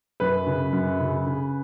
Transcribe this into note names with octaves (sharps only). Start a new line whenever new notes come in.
F#2 B4
C#3
F#2
C#3
C#3